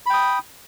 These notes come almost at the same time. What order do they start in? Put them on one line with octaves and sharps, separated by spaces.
B5 G5 D#6